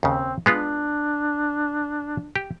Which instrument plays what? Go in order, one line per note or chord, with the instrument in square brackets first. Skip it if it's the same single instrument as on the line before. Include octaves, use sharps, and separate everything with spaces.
[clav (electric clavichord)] D#2 C#3 [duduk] C4
[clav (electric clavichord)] G#3 B3 F4 [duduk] D4
[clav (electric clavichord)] G4